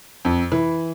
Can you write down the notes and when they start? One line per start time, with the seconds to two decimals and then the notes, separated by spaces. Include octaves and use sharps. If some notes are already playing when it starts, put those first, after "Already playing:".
0.25 F2
0.52 E3